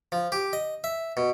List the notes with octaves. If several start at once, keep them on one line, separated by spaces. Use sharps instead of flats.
F3
G4
D#5
E5
B2